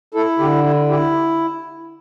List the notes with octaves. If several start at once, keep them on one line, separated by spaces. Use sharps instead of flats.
E4 A4
D3 G4
E4
E4 G4